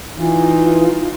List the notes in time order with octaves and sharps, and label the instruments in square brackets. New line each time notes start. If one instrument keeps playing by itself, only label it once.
[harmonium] E3 [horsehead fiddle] D#4 F4